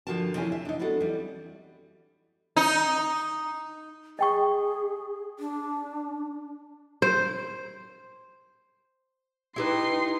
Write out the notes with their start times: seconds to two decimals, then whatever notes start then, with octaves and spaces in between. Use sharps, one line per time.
0.07 G2 D3 F3 F#4 A#4 A5
0.35 C3 E3 C4 C#4 G#5
0.52 E5
0.65 D4 D#4
0.79 B3 C4 D4 F#4 A4
1.00 E3 G3
2.56 D#4
4.19 G#4 D#5 G5 C#6
5.39 D4
7.02 C5
9.56 D#4 E4 G4 B4 C6